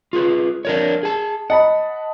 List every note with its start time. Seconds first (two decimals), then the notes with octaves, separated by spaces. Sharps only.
0.13 F4 G#4 B4
0.65 D4 A#4 C#5
1.03 G#4 A5
1.50 D#5 F#5 A5 B5